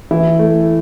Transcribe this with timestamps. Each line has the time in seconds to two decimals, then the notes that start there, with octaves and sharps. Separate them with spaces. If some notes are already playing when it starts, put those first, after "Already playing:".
0.11 E3 E4
0.39 A3